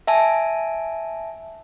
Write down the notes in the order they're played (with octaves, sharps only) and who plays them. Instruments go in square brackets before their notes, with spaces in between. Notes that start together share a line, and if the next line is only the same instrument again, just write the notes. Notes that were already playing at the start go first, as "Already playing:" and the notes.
[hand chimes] E5 G#5 A5